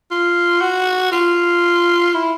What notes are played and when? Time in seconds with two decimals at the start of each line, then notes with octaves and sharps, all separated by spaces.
0.11 F4
0.61 F#4
1.12 F4
2.14 E4